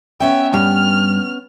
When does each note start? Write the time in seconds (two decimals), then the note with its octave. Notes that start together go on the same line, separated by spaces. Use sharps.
0.20 B3 C#4 E5 G5
0.54 G2 F6